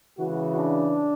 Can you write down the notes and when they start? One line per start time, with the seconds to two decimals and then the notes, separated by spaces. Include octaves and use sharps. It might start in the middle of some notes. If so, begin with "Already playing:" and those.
0.19 C#3 E3 G#3 F#4
0.57 D4